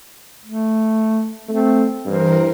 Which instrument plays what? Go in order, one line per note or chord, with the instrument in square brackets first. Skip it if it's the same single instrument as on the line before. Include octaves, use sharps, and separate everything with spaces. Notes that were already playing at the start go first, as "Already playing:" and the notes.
[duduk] A3
[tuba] A3 [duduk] C4
[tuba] G2 [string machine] E3 A#4 [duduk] C5